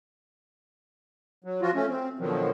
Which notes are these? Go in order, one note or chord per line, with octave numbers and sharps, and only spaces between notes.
F#3
F3 F4 F#4
A3 C#4
C4
B2 D3 D#3 F3 F#3